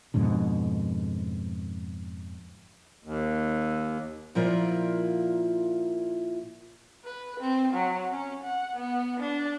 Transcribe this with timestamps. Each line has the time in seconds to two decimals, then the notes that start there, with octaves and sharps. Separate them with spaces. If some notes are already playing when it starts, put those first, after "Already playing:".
0.14 F2 G#2 B2 D3
3.04 D#2
4.35 A#2 F3 E4 F4 A#4 D5
7.04 B4
7.40 C4
7.73 F#3
8.11 C#4
8.44 F#5
8.76 B3
9.20 D4